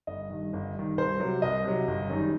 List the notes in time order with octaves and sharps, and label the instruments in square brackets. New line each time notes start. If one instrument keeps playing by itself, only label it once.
[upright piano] G1 D#5
G2 D#3
G1
G2 D#3
C2 C5
C3 F#3
C2 D#5
C3 F#3
G1
F#2 D#3 G3 D#4